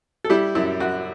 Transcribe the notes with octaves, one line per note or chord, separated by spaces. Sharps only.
A4
G3 E4 G4
F#2 E4
F#2 F#4